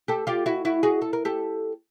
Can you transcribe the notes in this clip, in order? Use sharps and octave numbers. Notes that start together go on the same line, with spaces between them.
G4 A4
F4 G4
E4 F#4
E4 F#4
F#4 G#4
A4
A#4
G4 A4